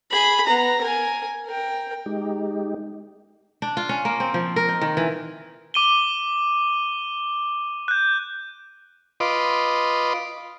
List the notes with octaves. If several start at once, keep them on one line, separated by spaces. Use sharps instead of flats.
G#4 B5
B3 A#5
A#4 G#5
A#4 G5
G#3 D#4 G4
D4
F4
C#4
A#3
C4
F3
A#4
D#4
D#3
E3
D6 D#7 G7
F#6 G6
F4 B4 D#5 C6 D6